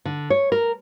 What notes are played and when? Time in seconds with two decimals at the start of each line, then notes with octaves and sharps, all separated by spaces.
0.05 D3
0.30 C#5
0.52 A#4